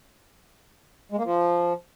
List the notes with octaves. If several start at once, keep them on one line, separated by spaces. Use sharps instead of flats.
G#3
A#3
F3